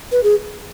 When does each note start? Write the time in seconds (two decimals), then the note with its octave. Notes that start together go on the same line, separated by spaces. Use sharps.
0.12 B4
0.23 G#4